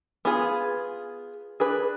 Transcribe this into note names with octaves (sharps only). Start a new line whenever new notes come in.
B3 F4 G#4
D4 G#4 B4